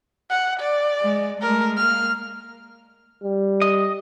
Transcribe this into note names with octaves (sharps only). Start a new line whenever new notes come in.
F#5
D5
G#3
G#3 A3 A#4
A#3 F6
G3
D#5